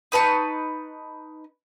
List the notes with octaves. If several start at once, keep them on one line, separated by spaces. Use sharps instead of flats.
D#4 B4 A5 C#6